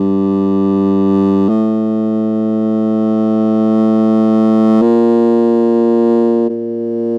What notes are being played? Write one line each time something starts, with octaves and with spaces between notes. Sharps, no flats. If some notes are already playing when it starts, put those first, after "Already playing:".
Already playing: G2
A2
A#2
A#2